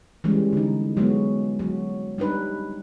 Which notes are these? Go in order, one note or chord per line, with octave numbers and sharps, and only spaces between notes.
E3 G3 G#3 C#4
D3 D#4
F#3 G#3 B3 C4
F#3
G3 D4 D#4 B4